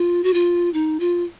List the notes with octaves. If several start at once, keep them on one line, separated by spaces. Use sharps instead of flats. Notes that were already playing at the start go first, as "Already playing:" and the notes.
Already playing: F4
F#4
F4
D#4
F4